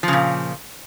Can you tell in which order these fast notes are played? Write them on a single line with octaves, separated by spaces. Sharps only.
F3 C#3 A#2